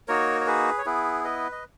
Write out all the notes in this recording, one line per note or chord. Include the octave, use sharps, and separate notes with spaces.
A#3 D#4 F#4 A#4 C#5
C#5
G#4 B4
C#5
B3 E4 G#4 B4
B4 D#5
D#5